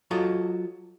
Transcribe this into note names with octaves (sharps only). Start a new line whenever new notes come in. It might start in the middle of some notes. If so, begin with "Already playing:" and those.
F#3 F4 A4 D#5